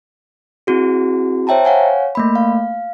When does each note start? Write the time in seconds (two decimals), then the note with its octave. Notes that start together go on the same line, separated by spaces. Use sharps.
0.67 C4 E4 F#4 G#4
1.47 C5 C#5 E5 G5 A5 A#5
1.65 C#5 F5 F#5 G#5
2.15 A3 A#3 B5
2.35 F5